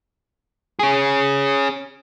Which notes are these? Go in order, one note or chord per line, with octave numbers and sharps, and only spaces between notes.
C#4 G#4